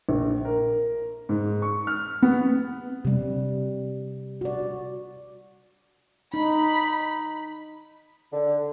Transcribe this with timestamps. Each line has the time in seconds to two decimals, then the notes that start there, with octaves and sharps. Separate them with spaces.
0.09 A#1
0.45 A#4
1.29 G#2
1.62 C#6
1.87 F6
2.22 B3
3.05 C3 G3
4.41 F#4 D5
6.34 D#4 B5
8.33 D3